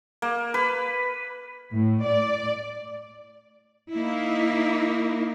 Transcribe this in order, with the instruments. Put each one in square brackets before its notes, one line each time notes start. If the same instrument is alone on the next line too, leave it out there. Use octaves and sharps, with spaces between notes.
[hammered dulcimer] A#3
B4
[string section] A2
D5
[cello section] A#3 D#4 E4